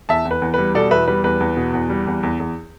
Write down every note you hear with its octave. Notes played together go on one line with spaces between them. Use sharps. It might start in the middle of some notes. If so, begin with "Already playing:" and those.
E2 E5 A5
E2
B4
E2
G3 B4
B2 A4 D5
E2 B4 E5
G3 B4
E2 B4
E2
B2
E2
G3
E2
E2
E2